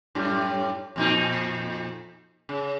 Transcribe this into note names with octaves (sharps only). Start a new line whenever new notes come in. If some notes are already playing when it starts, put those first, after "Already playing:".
F#2 A2 G3
F2 A#2 D#4
C#3